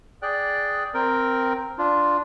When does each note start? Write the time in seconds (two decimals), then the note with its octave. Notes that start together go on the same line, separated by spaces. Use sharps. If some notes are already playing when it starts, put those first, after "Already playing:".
0.22 G#4 D5 G5 F#6
0.94 C4 A#4 G5
1.78 D4 F4